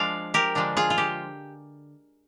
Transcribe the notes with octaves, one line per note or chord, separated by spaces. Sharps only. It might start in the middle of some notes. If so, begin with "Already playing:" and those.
Already playing: F3 G#3 D4 D5 F5 G#5
G4 A#4
D3 F3 G#3 D4 F4
F4 G#4
F4
G4